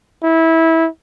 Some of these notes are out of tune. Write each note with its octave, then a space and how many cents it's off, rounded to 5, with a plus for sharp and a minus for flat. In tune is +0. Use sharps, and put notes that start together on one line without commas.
E4 -20